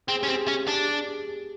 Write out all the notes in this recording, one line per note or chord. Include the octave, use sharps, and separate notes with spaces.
C4 G#4
C#4 G4
C4
G#4
C#4 G#4
G4
D4 G#4
G4
G#4
G#4